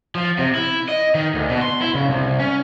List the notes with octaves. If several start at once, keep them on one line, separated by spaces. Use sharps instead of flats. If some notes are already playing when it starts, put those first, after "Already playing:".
F3
C3
E4
D#5
D#3
D2
B2
C6
E4
C#3
C2
C#4